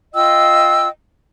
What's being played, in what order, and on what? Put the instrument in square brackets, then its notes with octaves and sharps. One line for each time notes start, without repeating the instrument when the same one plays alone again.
[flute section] F4 D#5 G5 E6